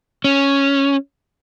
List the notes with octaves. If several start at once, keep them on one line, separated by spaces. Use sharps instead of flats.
C#4